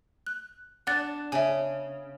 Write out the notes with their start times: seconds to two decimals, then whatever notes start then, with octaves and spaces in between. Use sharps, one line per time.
0.27 F#6
0.87 D4 F#5 F#6 A6
1.32 C#3 E5 G#5